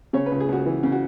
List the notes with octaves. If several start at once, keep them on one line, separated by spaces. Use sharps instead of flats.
C#3 C#5
B4
C#2
G#4
C#2 F#4
E3
C#3
F#4